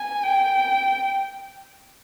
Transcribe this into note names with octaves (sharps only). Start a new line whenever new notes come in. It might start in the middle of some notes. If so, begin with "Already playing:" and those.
Already playing: G#5
G5